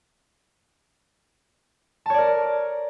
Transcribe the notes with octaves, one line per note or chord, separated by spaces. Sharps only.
A#4 C#5 D5 A5